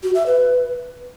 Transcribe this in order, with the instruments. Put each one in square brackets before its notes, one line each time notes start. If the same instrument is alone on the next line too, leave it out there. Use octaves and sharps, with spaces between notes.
[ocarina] F#4
E5
B4